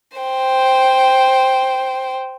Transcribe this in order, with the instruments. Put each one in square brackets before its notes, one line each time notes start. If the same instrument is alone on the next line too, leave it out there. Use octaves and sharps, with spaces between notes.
[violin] C5 G5